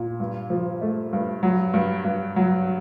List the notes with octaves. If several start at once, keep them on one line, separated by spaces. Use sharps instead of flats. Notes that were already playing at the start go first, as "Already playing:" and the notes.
Already playing: A#2
G2
F3
A3
G2
F#3
G2
G2
F#3